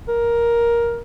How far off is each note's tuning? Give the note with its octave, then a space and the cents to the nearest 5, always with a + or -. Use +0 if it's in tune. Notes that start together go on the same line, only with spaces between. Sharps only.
A#4 +10